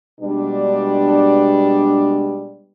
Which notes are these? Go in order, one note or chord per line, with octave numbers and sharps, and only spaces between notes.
B2 G3 G#3 B3 D4